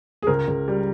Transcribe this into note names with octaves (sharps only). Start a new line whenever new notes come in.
G#4
C#2 A#4
C#2
G3